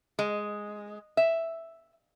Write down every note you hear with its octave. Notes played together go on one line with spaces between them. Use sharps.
G#3
E5